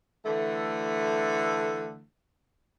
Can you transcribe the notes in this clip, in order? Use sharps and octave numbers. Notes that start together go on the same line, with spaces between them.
D3 E3 A3